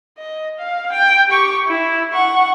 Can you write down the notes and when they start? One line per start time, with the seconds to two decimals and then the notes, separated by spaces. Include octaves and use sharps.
0.18 D#5
0.59 F5
0.92 G5
1.29 G4 C#6
1.67 E4
2.13 F#5 C#6